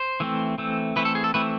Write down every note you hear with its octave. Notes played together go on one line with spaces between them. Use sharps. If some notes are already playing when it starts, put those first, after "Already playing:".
Already playing: C5
E3 A3 C4
E3 A3 C4
E3 A3 C4 B4
A4
G#4
A4
E3 A3 C4 B4